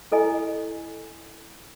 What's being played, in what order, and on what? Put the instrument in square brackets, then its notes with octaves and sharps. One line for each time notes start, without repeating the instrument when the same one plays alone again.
[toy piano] E4 A4 D#5 G#5